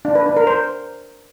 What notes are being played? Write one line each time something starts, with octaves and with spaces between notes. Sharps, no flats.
D4
B4
D4
A#4
C5